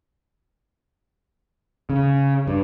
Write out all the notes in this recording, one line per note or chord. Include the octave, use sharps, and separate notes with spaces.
C#3
G2